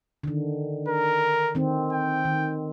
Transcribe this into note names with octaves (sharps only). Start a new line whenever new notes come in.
D3 D#3
A#4
D#3 C4
G5
D#3